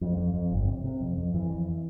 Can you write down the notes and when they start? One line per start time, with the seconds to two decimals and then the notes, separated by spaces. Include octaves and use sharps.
0.01 F2
0.17 F2
0.34 F2
0.51 G1
0.67 C3
0.84 C3
1.01 F2
1.17 F2
1.34 F2 E3
1.50 F2